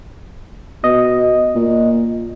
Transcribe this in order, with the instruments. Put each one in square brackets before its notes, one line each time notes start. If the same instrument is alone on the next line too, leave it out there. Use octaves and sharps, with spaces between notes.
[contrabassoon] B2 [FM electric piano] D#5
[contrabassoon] A#2